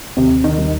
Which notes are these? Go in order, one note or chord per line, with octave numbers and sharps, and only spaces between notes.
D#2 C3 C4
D#3 D#4
G3